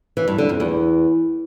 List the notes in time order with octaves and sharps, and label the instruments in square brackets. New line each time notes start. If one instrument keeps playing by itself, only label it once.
[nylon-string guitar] E3
G2
D3
F2
E2